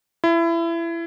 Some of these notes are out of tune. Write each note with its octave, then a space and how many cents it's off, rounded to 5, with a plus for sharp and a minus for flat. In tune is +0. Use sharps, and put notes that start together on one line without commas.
E4 +25